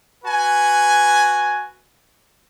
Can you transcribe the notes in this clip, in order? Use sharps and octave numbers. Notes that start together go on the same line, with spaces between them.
F#4 B4 G#5